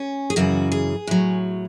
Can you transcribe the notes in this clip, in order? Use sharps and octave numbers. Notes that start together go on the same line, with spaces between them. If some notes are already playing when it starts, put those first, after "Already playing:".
Already playing: C#4
G#4
F#2 C#3 E3 F#4
G#4
A2 F#3